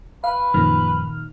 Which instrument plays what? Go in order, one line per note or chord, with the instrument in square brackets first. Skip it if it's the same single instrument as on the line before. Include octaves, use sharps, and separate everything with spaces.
[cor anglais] B4 [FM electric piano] F5
[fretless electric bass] F#2 F3 [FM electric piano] A#2 D#3 F6